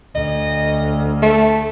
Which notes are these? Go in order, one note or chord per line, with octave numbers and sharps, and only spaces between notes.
D2 D#5
A3